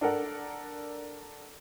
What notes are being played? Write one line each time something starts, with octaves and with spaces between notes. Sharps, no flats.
D4 A4 A#4 F#5